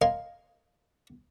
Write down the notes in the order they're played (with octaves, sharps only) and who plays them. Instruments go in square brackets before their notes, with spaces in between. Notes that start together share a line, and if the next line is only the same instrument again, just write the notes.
[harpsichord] A#4 D#5 F5 G#5 C6